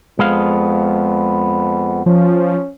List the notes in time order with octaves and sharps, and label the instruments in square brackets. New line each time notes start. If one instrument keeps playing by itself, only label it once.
[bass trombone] F2 [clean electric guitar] G#3 B3 F5
[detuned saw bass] F3 [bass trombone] C#4